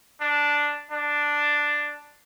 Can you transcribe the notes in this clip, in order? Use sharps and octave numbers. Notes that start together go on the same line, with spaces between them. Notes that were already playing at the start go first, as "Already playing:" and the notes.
D4
D4